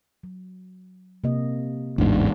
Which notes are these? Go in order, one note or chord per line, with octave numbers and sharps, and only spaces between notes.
F#3
C3 A#3 D#5
A1 E2 G#2 D4